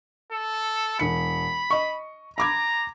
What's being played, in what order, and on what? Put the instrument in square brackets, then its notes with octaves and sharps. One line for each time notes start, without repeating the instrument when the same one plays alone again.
[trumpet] A4
[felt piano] E1 C#7 [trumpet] B5
[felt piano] D#5 C#6
[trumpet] A#5 [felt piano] B5 D6 G#6